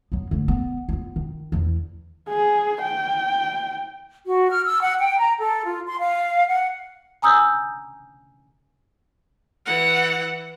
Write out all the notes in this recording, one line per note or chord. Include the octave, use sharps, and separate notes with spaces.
F#3 B3
D3 A3
B3
B3 F4
D#3
E2 E3
G#4
G5
F#4
F6
E6
F#5
G5
A#5
A4
F4
C6
F5
F#5
G#5 A#5 D#6 E6 G6
E3 F#5